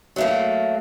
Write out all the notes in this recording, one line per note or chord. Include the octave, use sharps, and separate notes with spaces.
F#3 A3 A#3